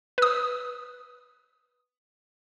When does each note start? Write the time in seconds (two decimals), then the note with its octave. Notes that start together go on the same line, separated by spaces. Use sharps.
0.18 B4 D#6